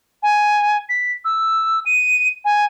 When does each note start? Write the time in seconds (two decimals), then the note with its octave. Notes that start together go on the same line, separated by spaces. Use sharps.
0.23 G#5
0.89 B6
1.25 E6
1.86 D#7
2.45 G#5